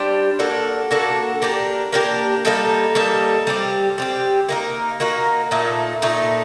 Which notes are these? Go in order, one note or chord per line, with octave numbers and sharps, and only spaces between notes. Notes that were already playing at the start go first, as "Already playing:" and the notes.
Already playing: G3 D4 G4 C5
A#3 D4 F#4 A4
A#3 D4 F#4 A4
A#3 D4 G4 A#4
A#3 D4 G4 A#4
G3 A#3 D#4 A4
G3 A#3 D#4 A4
G3 C4 G4
G3 C4 G4
A#3 D#4 F#4 A#4
A#3 D#4 F#4 A#4
A#2 A3 D#4
A#2 A3 D#4